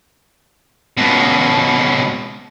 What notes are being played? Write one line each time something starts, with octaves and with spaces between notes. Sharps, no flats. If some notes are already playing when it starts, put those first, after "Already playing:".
C#2 B2